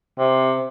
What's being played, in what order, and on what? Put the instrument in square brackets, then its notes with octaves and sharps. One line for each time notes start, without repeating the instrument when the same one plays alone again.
[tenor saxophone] C3